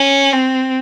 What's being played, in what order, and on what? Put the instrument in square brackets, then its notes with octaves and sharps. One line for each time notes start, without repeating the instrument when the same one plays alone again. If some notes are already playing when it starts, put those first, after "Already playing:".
Already playing: [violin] C#4
C4